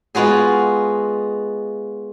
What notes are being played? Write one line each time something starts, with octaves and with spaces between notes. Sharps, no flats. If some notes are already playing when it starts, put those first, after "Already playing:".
G#3 B3 F4 F#4 G#4